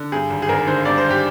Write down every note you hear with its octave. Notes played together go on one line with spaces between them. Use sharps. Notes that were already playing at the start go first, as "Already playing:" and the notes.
Already playing: D3
G2 G#4
G#1
G#4
G#1 A#4
D3 C5
G2 D5
C5
G#1
G4